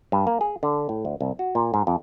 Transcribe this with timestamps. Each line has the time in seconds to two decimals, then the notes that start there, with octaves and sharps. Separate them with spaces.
0.12 G2
0.27 A#3
0.41 G#4
0.63 D3
0.89 A2
1.05 D2
1.21 C2
1.39 F#4
1.55 A#2
1.74 G#2
1.87 F2